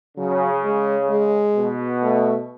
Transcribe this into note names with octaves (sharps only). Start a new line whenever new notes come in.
C#3 F#3
G#3
G#3
B2
A3